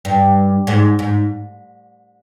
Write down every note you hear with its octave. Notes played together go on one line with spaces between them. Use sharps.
G2
G#2
G#2